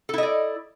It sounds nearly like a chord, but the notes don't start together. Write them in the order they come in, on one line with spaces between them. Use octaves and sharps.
A4 E4 D#5 D5